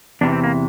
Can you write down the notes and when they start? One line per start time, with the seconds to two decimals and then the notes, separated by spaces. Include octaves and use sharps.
0.21 E2 C3 E3 D4
0.32 C4
0.44 A#3